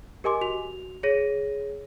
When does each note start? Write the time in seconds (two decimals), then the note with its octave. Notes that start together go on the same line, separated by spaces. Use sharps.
0.24 G4 A#4 D#5 G#5 C6 D6
0.41 F#4 F7
1.03 G#4 C#5 A#6 D#7